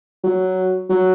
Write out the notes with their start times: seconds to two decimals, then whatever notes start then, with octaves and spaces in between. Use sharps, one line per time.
0.24 F#3
0.89 F#3